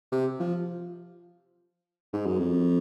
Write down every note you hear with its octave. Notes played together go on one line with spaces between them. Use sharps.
C3
F3
G#2
F#2
F2